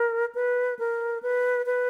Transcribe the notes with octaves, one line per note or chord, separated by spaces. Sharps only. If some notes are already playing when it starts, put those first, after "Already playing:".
Already playing: A#4
B4
A#4
B4
B4